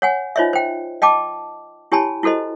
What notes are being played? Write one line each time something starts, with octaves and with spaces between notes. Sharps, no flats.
C#5 F#5 G#5
D#4 F4 C5 C#5 D#5 E5
C5 G5
D#5 G5 A5 D6
E4 G4 C#5 G#5 A5 B5
E4 F#4 A4 C5 D#5